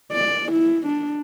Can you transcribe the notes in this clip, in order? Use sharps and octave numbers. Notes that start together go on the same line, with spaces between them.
D5
E4
D4